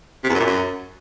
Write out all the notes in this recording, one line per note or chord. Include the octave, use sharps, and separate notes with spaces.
C3
E2
F#2
A#2
F#2